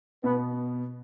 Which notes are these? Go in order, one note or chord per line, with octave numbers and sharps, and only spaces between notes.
B2 B3